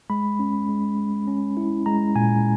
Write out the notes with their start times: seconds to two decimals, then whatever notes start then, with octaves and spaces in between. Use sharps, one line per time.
0.10 G#3 B5
0.39 C#4
0.69 G#3
0.98 G#3
1.27 C#4
1.57 E4
1.86 G#3 A#5
2.15 A#2 G#5